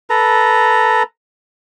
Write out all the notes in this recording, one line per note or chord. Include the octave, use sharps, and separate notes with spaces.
A4 B4 A#5